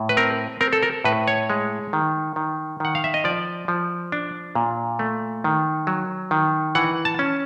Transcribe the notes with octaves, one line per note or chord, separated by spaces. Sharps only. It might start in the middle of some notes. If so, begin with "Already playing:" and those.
Already playing: A2
B4
C4 A#4
C4 A#4
A4
A#4
A2 B4
C#5
G#3
D#3
D#3
D#3 F#5
F5
E5
D#5
F3 D5
F3
D4
A#2
A3
D#3
F#3
D#3
E3 F#5
A5
C#4